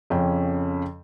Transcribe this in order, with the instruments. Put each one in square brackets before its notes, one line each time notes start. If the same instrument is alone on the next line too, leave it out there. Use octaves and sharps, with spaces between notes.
[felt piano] F2 C#3 C#4 G5